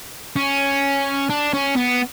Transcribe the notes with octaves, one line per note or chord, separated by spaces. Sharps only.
C#4
D4
C#4
B3